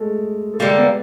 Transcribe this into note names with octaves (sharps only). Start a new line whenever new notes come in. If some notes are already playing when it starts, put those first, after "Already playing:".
Already playing: G#3 A3 A4
A4
D3 G3 G#3 A#3 G#4
B3 B4